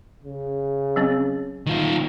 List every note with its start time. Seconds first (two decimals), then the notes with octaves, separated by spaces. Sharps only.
0.24 C#3
0.96 F#3 C4 C#4
1.66 D#3 F4